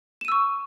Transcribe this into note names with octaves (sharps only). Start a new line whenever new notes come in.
C#6 E6 D#7 E7